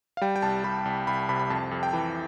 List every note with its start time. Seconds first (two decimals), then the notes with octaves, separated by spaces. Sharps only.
0.17 F5
0.21 G3 G5
0.36 G5
0.42 C2 A5
0.64 G3 B5
0.85 C2
1.07 C2 B5
1.29 C3 B5
1.39 B5
1.50 F2 A5
1.71 F2
1.83 G5
1.93 E3